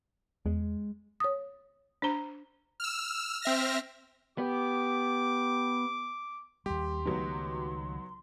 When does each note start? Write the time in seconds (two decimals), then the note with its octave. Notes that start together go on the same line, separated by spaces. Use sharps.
0.46 E2 G#3
1.20 C#5 D#6
2.02 D4 C5 A#5
2.80 E6 F6
3.42 C4 E5 F6 A#6
4.38 B3 G4 D6
6.66 D#2 G3 G4 C6
7.05 C#2 D#3 F#3 A3 B3 D#4